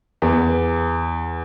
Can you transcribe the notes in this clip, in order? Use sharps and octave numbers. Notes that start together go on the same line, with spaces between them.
E2